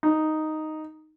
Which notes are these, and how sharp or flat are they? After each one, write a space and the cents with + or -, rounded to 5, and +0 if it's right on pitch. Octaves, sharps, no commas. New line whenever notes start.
D#4 +0